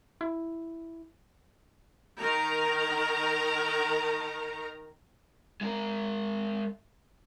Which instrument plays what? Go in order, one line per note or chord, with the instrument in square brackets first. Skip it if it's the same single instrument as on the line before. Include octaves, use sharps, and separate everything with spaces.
[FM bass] E4
[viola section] D#3 A#4 A#5
[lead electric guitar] G#3 A#4